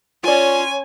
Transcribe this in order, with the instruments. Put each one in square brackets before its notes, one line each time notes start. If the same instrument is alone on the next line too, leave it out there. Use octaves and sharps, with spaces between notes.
[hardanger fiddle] C#4 C6 [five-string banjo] F4 D5 [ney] C#5 [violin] G#5